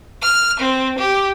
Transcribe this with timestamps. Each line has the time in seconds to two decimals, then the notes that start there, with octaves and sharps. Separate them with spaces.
0.22 F6
0.60 C4
0.98 G4